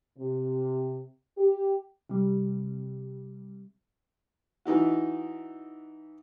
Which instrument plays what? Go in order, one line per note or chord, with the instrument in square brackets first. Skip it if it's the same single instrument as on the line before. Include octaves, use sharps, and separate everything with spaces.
[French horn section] C3
G4
[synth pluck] C3 G3
[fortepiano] E3 D#4 E4 F#4